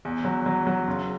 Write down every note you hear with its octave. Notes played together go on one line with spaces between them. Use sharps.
E2
F#3
F#3
F#3
F#1